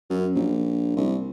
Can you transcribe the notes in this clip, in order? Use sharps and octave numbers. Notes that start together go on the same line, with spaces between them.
F#2
A#1
C2